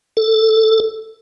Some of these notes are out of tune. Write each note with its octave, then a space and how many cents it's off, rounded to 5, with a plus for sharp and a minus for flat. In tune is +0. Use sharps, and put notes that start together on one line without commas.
A4 +5